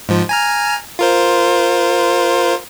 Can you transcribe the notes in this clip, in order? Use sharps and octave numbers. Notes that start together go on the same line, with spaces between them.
G#2 F3
G#5 A#5 F6
F4 A#4 C5